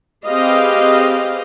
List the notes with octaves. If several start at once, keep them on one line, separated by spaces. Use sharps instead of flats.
C4 G4 G#4 B4 D#5 F5